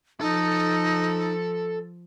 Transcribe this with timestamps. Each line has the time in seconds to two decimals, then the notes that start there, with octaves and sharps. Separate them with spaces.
0.21 F3 D#4 A4 A5